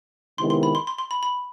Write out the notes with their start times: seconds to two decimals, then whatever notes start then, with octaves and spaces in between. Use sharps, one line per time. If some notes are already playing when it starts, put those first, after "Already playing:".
0.38 C3 D#3 G#3 B3 E4 C6
0.50 C6
0.63 B5
0.75 C6
0.87 C6
0.98 C6
1.11 B5
1.23 B5